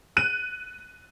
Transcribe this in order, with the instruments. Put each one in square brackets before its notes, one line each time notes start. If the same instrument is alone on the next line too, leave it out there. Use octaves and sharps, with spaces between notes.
[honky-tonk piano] F#6 D#7